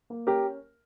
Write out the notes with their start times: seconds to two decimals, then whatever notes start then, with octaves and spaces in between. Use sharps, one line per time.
0.10 A#3
0.27 C#4 G4 A#4